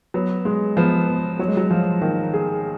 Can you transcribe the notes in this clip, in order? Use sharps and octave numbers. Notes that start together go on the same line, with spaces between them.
F#3 B3
G#3
F3 B3
B3
F#3 C#5
G#3
F#3
F3 F4
D#3 A#3
G#4